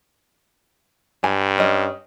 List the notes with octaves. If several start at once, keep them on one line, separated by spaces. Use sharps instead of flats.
G2 G#5
C#4 D#5